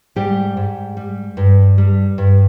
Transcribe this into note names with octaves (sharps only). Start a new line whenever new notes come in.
G#2 G3 G4
G#2
G3
G2
G3
G2